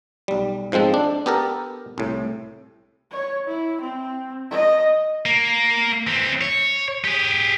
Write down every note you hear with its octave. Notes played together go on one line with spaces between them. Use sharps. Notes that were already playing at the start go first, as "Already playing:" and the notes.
B1 G3
G#2 F3 G#3 C4 A4
D4
B3 G4 A4 A#4
C2 A2
C#5
E4
C4
D#5
A#3
E3 C4
C#5
G4 G#4